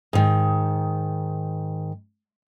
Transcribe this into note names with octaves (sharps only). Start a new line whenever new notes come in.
G#2 D#3